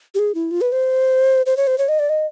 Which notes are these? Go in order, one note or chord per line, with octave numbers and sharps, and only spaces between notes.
G4
G#4
E4
F4
B4
C5
C5
C#5
C5
C#5
D#5
D5
D#5